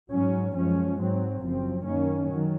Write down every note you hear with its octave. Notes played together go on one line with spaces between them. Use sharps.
G#2 F#3 C#4
F#2 F3 G#3 C#4
G#2 F#3 C4
F#1 F#2 F3 C4
F#2 D#3 A#3 C#4
D#3 F#3